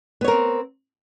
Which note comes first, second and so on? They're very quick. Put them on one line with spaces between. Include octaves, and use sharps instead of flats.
B3 C#5 A#4 C4